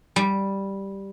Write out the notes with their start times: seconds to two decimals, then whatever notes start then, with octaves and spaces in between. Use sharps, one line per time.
0.16 G3